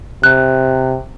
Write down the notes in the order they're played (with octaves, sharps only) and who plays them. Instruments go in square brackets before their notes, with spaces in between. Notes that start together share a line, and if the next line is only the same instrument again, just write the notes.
[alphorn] C3 [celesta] F#6